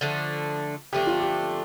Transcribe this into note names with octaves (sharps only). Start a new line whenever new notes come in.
D3 F3 A3 D4
D3 F3 A3 D4 G4
F4
G4